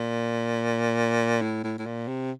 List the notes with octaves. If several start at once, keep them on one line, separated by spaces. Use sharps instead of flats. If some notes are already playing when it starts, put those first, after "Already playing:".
Already playing: A#2
A2
A2
A2
A#2
C3